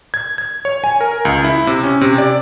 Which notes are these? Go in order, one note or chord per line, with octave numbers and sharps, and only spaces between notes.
G#6
G#6
C#5
G#5
A#4
C#2
E4
C3
C#4
C3
D5